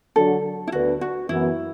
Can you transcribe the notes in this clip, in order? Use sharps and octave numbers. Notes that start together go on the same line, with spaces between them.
D3 F#3 D4 F#4 A4
E4
D2 D3 B3 D4 F#4 B4
F#4
F#2 E3 B3 E4